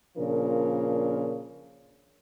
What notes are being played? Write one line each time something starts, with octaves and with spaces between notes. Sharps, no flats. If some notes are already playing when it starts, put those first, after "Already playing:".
A#2 C#3 F3 D4 A#4